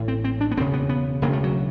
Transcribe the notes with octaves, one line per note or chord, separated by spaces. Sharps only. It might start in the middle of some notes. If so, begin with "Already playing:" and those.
Already playing: A1 A2
C4
C4
D4
B3
E1 D#2 C#3 C4
B3
B3
E1 D2 C#3 A#3
A3
F#3